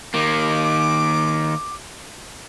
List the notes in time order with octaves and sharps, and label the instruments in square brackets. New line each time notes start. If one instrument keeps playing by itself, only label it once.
[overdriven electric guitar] D#3 A#3 [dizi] D6